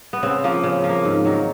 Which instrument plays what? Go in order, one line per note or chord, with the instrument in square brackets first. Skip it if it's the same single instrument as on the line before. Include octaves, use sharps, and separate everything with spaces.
[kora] B3
C#3 C4
F3 A#3
C#3
F3
A#3
G#2
D#3 F#3